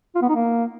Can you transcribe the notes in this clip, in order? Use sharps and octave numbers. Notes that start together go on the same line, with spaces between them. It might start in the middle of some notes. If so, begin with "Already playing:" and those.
F4
B3
D#4
A#3